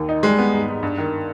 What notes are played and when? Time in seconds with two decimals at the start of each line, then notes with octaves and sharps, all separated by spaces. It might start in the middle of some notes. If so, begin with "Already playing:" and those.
Already playing: D#2 D#3
0.09 D#4
0.23 G3 G#3
0.38 B3
0.53 G#2
0.68 G#2
0.83 G2
0.98 D#3